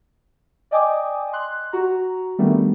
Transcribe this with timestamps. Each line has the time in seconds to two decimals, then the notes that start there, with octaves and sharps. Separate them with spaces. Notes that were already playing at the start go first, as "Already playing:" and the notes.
0.71 D5 D#5 G5 G#5 D6 D#6
1.33 C6 F#6
1.72 F#4 A#5
2.39 D#3 G3 A3 B3 D4